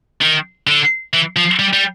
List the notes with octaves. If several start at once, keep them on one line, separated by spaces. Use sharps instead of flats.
D#3
D3
E3
F3
G3
G3